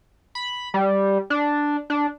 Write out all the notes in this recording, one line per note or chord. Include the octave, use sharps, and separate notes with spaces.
B5
G3
D4
D4